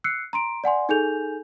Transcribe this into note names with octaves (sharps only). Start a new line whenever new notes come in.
E6 F#6 C7 C#7
A#5 C6 D7
D5 F#5 G#5 C6
D#4 G#4 A4 G#5 G6 F7